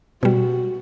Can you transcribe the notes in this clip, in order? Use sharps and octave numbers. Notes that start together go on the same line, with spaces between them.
B2 G3 F#4